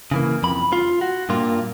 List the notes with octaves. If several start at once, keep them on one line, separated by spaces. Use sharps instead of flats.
C#3 E3 A#3
F2 B5
F4
F#4
G2 A#2 A#3 F4